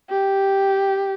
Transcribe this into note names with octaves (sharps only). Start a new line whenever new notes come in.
G4